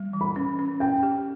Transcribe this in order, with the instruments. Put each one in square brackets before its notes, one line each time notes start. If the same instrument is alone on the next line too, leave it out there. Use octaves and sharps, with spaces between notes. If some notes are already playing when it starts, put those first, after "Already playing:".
Already playing: [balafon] G3
E3
[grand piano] B5
[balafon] C#4
C#4
[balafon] C#4 [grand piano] G5
[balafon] G4